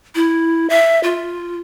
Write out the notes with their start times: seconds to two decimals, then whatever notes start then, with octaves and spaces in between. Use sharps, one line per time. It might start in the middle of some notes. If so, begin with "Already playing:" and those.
0.15 E4
0.70 E5
1.03 F4